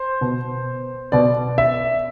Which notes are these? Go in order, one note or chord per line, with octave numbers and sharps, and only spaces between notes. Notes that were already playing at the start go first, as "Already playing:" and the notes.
Already playing: C5
B2
B2 D5
E5